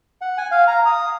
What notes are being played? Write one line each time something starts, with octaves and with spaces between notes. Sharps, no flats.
F#5
G#5
F5
A#5
D#6